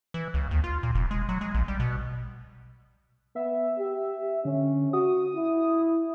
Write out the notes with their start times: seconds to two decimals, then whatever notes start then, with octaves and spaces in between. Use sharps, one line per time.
0.14 E3
0.34 C#2
0.51 D#2
0.64 F4
0.83 A#2
0.95 F1
1.11 G#3
1.29 F#3
1.41 G#3
1.54 A#1
1.68 G3
1.80 B2
3.36 B3 E5
3.78 G4
4.45 D3 C#4
4.93 F#4 D#6
5.36 E4